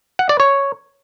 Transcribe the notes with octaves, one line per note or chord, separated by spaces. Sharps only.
F#5
D5
C#5